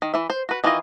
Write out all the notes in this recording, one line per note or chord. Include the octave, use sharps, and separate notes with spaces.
D#3
E3 E5
C5
F#4 B4
D#3 E3 D#4 F4 D#5